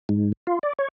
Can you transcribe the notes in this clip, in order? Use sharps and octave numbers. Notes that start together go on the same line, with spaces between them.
G#2
F4
D5
C#5